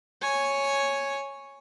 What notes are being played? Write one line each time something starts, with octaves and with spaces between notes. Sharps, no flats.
C#5 G#5